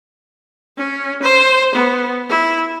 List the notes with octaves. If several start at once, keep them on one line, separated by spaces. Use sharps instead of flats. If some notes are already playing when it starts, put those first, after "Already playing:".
C#4
C5
B3
E4